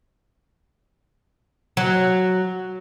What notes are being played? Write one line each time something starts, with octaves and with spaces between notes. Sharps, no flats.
F#3